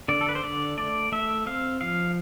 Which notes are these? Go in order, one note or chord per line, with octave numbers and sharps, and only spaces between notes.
D3 D5
A4
B4
C5
D3 D5
A3 D5
A3 E5
C4 F5
F3 F5